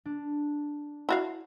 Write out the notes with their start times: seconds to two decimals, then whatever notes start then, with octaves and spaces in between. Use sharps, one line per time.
0.05 D4
1.09 E4 F#4 F5